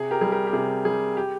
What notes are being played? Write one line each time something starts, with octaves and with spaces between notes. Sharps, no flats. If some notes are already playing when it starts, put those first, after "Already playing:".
Already playing: C3 G#4
G4 A#4
G3 G#4
G4 A#4
G4
C3 G#4
G3 G#4
G4